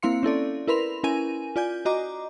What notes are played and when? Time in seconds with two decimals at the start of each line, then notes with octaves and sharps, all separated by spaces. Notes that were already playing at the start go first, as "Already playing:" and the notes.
0.03 A#3 C4 E4 F5 C6 C#7
0.23 C#4 E4 A4 D5
0.67 E4 A#4 B4 B5 C6 F7
1.03 C#4 E4 A#4 G#5 D#7
1.56 F4 D5 G#5 G6
1.85 F#4 D#5 A#5 D6